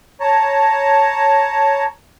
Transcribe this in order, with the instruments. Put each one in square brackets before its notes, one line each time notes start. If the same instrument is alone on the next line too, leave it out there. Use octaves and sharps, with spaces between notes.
[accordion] C#5 A5 A#5